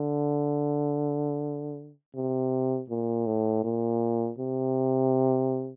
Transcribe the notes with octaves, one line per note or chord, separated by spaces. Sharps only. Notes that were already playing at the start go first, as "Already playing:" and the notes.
Already playing: D3
C3
A#2
A2
A#2
C3